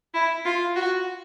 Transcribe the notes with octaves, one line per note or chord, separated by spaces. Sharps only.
E4
F4
F#4